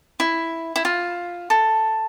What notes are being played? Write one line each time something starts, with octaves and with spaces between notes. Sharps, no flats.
E4
E4
F4
A4